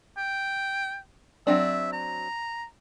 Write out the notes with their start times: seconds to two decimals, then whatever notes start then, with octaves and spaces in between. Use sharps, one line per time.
0.17 G5
1.47 F#3 C4 D4 E5
1.93 A#5